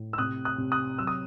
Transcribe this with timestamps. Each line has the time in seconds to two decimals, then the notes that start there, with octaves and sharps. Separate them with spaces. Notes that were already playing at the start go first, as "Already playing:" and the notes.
Already playing: A2
0.13 E6
0.18 C3 D#6 F#6
0.45 D#6 F#6
0.58 C3
0.72 D#6 F#6
0.99 F#3 E6
1.07 D#6